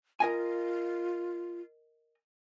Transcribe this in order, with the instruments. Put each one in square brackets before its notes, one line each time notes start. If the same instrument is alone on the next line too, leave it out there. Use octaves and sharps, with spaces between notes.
[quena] F4 [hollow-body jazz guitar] A#4 D#5 G#5